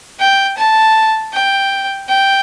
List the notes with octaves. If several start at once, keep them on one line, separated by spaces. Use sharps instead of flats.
G5
A5
G5
G5